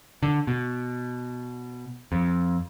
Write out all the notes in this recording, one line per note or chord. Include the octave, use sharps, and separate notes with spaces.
D3
B2
F2